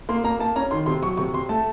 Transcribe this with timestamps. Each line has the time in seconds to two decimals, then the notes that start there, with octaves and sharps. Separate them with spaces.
0.09 A#3 C6
0.24 A#3 A#5
0.39 A#3 A5
0.56 C#4 A#5
0.71 D#3 C6
0.86 C3 C6
1.02 F#3 C#6
1.17 C3 C#6
1.33 C3 C6
1.49 A3 A5